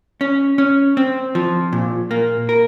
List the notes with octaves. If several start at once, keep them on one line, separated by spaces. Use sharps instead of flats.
C#4
C#4
C4
F3
A#2
A#3
A#4